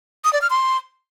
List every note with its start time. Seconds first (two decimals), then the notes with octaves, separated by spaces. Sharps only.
0.24 D#6
0.33 D5
0.42 F6
0.50 C6